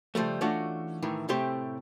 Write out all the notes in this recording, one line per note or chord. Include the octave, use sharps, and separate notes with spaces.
C#3 F3 G3 A3
E3 A3 C#4 D4 F4 F#4
A2 D#3 E3
A2 C3 A3 C4 G4 C6